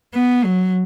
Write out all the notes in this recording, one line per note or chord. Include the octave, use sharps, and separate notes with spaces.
B3
F#3